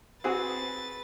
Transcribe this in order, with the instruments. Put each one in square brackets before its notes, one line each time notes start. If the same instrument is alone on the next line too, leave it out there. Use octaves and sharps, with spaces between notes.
[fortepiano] C4 F#4 G#4 [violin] B4 A6